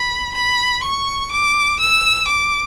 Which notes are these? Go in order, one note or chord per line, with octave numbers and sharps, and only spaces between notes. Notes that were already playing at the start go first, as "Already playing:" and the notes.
Already playing: B5
B5
C#6
D6
E6
D6